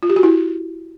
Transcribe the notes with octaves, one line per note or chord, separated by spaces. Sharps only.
F4
G4
F#4
E4